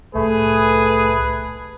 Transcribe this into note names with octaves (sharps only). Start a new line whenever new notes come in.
C2 A2 A3 G#4 B4